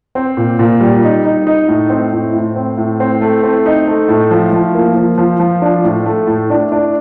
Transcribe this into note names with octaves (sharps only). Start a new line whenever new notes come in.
C4
A#2
A#2
G3
D#4
D#4
D#4
A2
C4
A2
A2
C4
A2
C4
A3
C4
D#4
A3
A2
F3
F3
A#3
F3
F3
F3
D4
A2
A3
A2
D4
D4